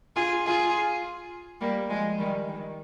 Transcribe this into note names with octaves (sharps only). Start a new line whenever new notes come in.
F4 G#4
F4 G#4
G3 A#3
F3 G#3
D#3 G3
D#3